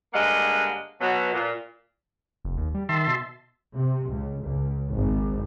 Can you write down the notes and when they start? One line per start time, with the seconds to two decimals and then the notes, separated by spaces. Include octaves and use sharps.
0.13 G2 D3 G#3 A#3 F5 F#5
1.01 B2 F#3 B3
1.33 A#2
2.45 F1
2.57 D#2
2.74 G3
2.89 D#3 E5 A5 C6
3.07 B2
3.75 C3
4.11 C#2
4.43 C#2
4.92 G#1